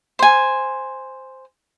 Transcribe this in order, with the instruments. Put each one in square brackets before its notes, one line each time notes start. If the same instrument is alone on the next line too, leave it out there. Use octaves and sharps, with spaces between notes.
[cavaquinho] C5 G#5